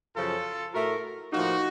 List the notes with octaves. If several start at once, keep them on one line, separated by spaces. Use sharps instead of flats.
F#2 C#3 F3 F4 A4
A2 A3 F#4 A#4
A2 F3 A#3 D#4 F#4